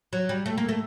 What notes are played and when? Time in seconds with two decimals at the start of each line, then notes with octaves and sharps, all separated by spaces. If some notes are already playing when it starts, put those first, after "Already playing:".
0.13 F#3
0.29 G3
0.46 A3
0.58 A#3
0.69 A3